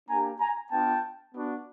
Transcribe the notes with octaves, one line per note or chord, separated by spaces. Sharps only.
A#3 D4 G4 G#5 A#5
G#5 A#5
B3 D4 F4 G5 A5
B3 D4 F#4